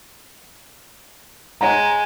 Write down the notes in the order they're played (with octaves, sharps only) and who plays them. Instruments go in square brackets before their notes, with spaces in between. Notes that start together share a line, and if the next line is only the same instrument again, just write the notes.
[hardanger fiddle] G#3 [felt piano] C#5 F#5 A#5